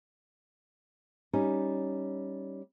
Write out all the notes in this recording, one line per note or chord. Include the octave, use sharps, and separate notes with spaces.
G3 C#4 D#4